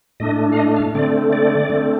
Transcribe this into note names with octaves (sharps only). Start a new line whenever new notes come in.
A2 A3 D4 D#5
F5
D#5
F5
D3 A3 C4 D5
D5
D3 A3 C4